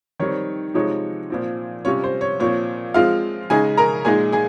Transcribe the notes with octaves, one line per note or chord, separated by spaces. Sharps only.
D#3 G3 C4 C#5
C3 F3 G#3 D#4 C#5
A#2 F3 C4
C3 G3 C#4 F4 C#5
C5
C#5
A#2 F3 C4 C#5
F3 G#3 C4 F4 F5
C#3 G#3 D#4 G#4 G#5
A#4 A#5
A#2 G#3 D#4 G#4 G#5
G#4 G#5